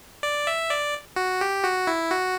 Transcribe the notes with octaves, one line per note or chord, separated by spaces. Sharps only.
D5
E5
D5
F#4
G4
F#4
E4
F#4